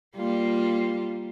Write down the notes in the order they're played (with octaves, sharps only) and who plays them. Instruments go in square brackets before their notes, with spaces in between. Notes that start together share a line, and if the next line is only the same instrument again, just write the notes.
[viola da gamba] G3 A#3 F4